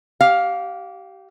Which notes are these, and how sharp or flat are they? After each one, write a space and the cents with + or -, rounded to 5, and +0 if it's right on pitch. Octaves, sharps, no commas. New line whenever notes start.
G4 -25 F5 +10